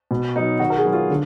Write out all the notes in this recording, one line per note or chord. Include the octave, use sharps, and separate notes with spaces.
B2
F#3 B3 D#4
D#3 F#4
A#4
G#4
F#3 B3
F4
D3